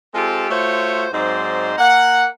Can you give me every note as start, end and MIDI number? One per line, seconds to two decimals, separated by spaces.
0.14 0.47 56
0.14 0.47 60
0.14 0.47 65
0.14 0.47 67
0.14 0.47 69
0.50 1.07 57
0.50 1.07 65
0.50 1.07 66
0.50 1.07 72
0.50 1.07 73
1.13 1.74 44
1.13 1.74 54
1.13 1.74 60
1.13 1.74 63
1.13 1.74 72
1.13 1.74 74
1.78 2.27 58
1.78 2.27 78